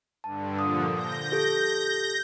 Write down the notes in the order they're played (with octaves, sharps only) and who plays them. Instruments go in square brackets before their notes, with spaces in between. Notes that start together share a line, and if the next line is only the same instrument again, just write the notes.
[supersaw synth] G2 D3 [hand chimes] A5
[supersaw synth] A#2 D3 F3 [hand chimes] D#6
[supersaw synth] G6 A#6
[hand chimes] G4 A4